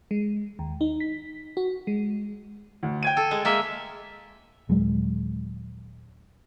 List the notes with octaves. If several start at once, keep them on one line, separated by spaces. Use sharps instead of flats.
G#3
D#2
D#4
B6
F#4
G#3
D2
G5 G#6 D#7
A4
G#3
G#3 A#3 E5
D#1 F#3 G#3